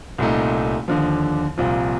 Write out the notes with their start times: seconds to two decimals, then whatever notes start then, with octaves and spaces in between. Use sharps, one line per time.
0.18 C2 A#2 A3 D#4
0.88 D#2 D3 F3
1.57 C2 A#2 F3 C4 F4